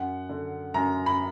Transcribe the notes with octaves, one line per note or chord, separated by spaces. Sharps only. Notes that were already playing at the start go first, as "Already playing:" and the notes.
Already playing: F#2 F#5
D3
F#2 A#5
B5